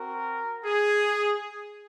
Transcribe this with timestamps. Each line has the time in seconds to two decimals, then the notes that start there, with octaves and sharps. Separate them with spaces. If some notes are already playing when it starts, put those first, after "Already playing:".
Already playing: C4 F#4 A#4
0.64 G#4